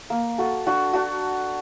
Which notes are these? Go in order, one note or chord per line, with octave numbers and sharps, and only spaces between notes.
A#3
F#4 A4
D4 F#4
D4 F#4